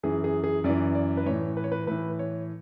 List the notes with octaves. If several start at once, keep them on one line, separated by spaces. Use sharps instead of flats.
F#2 E3 G#4
G#4
G#4
F#2 E3 D5
D5
B4
A2 E3 C#5
B4
C#5
B4
A2 E3 B4
C#5